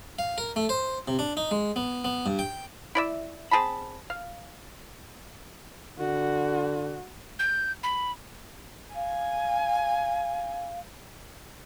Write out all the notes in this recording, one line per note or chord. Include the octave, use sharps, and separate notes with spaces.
F5
A#4
A3
C5
C3
D4
D#4
G#3
B3
B3
G2
G5
E4 D5 E5
C4 G#4 A5 B5
F5
D3 F#4
G6
B5
F5 G#5